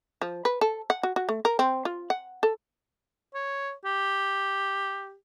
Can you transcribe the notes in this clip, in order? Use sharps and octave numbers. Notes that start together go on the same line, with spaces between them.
F3
B4
A4
F#5
F#4
F#4
A3
A#4
C4
F4
F#5
A4
C#5
G4